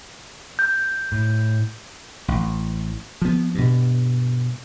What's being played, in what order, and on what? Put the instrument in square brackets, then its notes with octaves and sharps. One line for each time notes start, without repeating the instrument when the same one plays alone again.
[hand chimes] G6
[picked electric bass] A2
[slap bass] A1
F3 B3
G2 B2